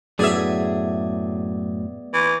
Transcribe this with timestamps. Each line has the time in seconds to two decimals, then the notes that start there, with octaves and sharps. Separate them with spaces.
0.19 F#2 A2 F#3 B3 G#4 D5 E5
2.13 E3